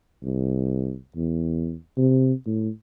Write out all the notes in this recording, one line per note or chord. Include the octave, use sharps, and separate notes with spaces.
C2
E2
C3
A2